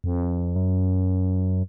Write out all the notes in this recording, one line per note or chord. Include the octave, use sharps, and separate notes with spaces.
F2
F#2